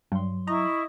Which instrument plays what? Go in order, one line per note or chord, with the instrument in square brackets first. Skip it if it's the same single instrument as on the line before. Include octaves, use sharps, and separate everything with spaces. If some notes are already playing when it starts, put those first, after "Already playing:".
[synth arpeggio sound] G2 [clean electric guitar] F#3 C6
[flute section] E4 C#6 [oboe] D#5 [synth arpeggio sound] A#5